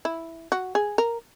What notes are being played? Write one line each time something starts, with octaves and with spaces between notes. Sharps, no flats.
E4
F#4
G#4
A#4